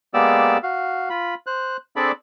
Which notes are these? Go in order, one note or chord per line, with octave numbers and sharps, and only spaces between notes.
G#3 A#3 B3 G4 D5 E6
F#4 F5
F4 B5
C5 F#6
C4 D4 G#4 A4 D5 B5